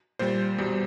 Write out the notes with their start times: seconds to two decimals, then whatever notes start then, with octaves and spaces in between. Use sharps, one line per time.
0.19 A#2 G3 C5
0.58 E2 B2 G3